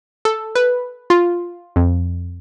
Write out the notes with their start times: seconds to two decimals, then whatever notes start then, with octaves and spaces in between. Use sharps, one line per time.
0.25 A4
0.56 B4
1.10 F4
1.76 F2